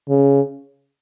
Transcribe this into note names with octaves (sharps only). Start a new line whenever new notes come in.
C#3